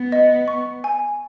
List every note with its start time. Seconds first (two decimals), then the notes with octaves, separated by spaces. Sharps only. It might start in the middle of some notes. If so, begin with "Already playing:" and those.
Already playing: B3
0.12 D#5
0.48 C#6
0.84 G#5